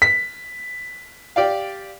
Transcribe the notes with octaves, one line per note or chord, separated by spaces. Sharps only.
B6
G4 D5 F5